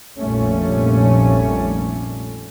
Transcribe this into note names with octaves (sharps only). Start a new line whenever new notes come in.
F1 A#1 A#2 G3 A3 C#4